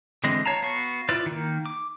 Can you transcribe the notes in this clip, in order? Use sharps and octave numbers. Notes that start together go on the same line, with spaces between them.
D3 E3 G#3 C4 D#5
C#5 F5 A5 A#5
B3 F#4 F5 C#6
E4 F4 B4 D5
D#3 A#3
D6